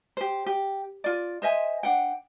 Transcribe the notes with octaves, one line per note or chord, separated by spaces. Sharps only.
G4 C5
G4
F4 D5
C5 D#5 E5 G#5
D4 F#5 G5